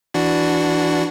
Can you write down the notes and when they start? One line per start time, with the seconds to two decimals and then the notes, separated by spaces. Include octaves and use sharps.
0.14 E3 D4 F#4